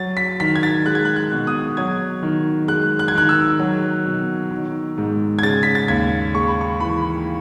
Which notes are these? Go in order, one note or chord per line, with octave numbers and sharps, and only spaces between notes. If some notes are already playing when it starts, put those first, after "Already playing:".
Already playing: F#3 A6
B6
D#3 B6
G#6
A6
G#3 F#6
G#6
F#6
F#6
B2
D#6
F#3 G#6
D#3
G#3 F#6
F#6
G#6
D#3 F#6
E6
F#3
B2
D#3
G#2
G#6
C#3 A6
B6
A6
D#2 G#6
G#3 C#6
B5
C#6
E3 B5